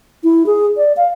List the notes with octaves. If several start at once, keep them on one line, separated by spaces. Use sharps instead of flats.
E4
G#4
D5
F5